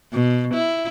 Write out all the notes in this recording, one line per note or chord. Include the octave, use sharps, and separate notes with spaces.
B2
E4